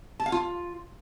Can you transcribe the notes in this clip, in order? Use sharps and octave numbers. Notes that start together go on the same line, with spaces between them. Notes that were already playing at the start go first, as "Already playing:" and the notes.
A5
F5
F4